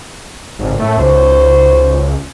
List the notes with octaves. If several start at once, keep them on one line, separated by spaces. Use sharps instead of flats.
G#1 F2 A2 C#3
F#2 A2 A3
C#2 D#4 F#4 C5